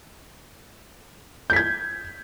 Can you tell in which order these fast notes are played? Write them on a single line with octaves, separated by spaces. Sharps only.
G6 B6 G#6